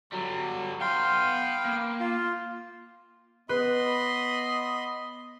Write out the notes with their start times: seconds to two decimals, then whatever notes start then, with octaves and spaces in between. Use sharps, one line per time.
0.12 D3 F#3 G3
0.81 B3 F5 G5 C6
1.65 A#3
2.00 F4
3.49 B3 B4 D#5 B5 C6